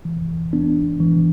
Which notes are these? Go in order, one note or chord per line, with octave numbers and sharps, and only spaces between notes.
E3
B3 D4
E3